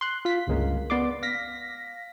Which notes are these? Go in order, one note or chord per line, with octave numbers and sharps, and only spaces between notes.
C6 F#6
F4 B6
G1 C#2 G#3 A#3
B3 D5 C6 D6
F5 A#6 B6